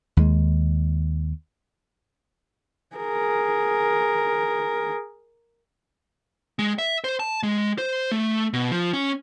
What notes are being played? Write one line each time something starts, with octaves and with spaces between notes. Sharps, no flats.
D#2 G#3
G#4 A#4
G#3
E5
C5
A5
G#3
C5
A3
B2
F3
C#4